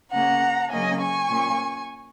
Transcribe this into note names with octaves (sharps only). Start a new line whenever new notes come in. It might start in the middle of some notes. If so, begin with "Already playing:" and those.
C#3 A#3 C#4 F#5 A#5
C#3 F#3 A#3 C#4 D#5 G#5
G#5 C#6
A#2 A#3 C#4